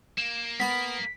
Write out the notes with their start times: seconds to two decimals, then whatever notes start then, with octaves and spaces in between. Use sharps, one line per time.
0.17 A#3 E7
0.60 B3 B5 B6